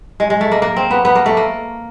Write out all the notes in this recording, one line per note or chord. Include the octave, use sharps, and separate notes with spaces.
G#3
G#3
A3
A#3
A#3
C4
B3
B3
A#3
A3
A#3